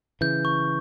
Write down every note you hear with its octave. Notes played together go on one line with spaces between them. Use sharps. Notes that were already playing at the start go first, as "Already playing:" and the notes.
C#3 E3 G6
C#6